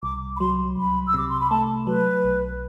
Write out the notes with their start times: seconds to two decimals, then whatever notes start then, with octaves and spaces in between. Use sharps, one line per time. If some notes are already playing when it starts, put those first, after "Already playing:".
0.03 C2 D6
0.36 B5
0.40 F#3 C6
0.77 C2 B5
1.07 E6
1.14 C3 D6
1.29 C6
1.40 B5
1.50 A3 A5
1.87 F#3 B4
2.24 B1